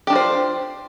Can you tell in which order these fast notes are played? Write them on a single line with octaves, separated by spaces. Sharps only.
G4 D4 F4 C5